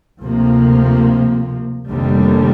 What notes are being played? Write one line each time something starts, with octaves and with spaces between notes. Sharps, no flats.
D2 C3 F3 A#3
F1 D#2 D3 G3